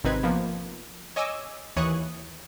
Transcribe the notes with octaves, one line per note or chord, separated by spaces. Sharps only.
G#1 C3 C4 D#4 B4 G#6
F3 A#3 B3
C#5 D#5 G#5 D6 E6
D#2 E3 C#5 C#6 D#6 F#6